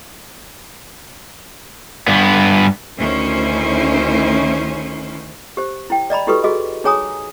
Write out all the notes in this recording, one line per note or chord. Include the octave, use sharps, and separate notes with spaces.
G2 B3
D2 D#3 C#4 E4 C5
G4 C5
E4 G5
D5 D#5 A#5 B5
E4 F#4 G4 A4 B4 C#6
F#4 G#4 D#5
D#4 G#4 C#5 G#5 A#5 D#6